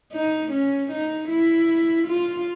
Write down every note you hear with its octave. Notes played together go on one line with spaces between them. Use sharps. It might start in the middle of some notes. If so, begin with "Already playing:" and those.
D#4
C#4
D#4
E4
F4